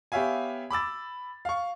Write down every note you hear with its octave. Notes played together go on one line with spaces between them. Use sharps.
B3 G4 C#5 E5 F5 G#5
B5 D6 E6 A6
F5 C#6